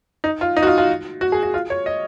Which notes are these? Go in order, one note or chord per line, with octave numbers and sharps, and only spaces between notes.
D#4
F4
D#4
F#4
F4
F4
F#4
G#4
F#4
F4
C#5
D#5